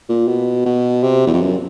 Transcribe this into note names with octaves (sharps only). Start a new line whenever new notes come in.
A#2
B2
B2
C3
E2
F2
F#2